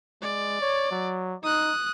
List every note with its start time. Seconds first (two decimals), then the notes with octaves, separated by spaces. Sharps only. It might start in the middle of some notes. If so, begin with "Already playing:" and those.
0.22 G#3 D5
0.61 C#5
0.91 F#3
1.43 D#4 D#6 F#6